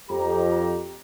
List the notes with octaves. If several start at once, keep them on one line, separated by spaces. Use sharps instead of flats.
F2 G4 A#5